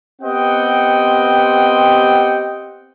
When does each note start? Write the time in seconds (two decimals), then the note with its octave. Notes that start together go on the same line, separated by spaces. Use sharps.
0.22 B3 C4 G4 D#5 F#5 G5